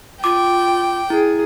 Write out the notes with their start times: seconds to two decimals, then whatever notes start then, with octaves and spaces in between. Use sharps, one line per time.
0.24 F4 G5 D6
1.10 E4 G#4